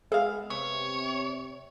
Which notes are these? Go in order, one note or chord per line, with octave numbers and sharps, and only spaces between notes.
G#3 B3 G#4 E5 F5
C3 B3 C#5